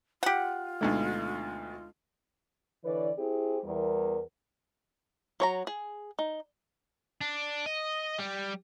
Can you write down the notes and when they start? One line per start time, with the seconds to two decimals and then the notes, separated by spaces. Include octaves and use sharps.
0.23 F4 G4 F#5
0.81 D2 B2 G#3 A3 D4 D#4
2.85 D3 E3 B4 C#5 D5
3.19 C4 E4 G4 G#4
3.64 E2 G3 A#4
5.40 F#3 C#5 A#5
5.67 G#4
6.19 D#4
7.21 D4
7.66 D#5
8.19 G3